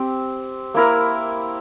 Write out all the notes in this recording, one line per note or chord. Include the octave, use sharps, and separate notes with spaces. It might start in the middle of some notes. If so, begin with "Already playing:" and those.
Already playing: C4 G4
A#3 E4 A#4